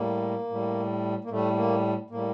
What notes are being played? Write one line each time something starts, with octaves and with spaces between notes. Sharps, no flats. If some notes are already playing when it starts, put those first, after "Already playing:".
Already playing: A2 G3 A#3
A2 G3
A#3
A2 G3 A3
A#3
A2 G3 A#3